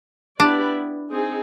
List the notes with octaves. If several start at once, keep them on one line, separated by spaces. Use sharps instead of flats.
B3 D4 E4 G4 B4 D5
C4 D#4 G#4